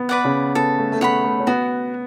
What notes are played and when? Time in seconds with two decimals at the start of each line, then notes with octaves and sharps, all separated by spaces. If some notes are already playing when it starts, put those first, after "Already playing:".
Already playing: B3
0.09 B4 D5 F#5
0.24 C#3 C#4
0.55 B3 A4
0.78 A3
0.92 A3
1.01 B3 C#5 F#5 B5
1.24 A3
1.40 C#4
1.47 B3 F#4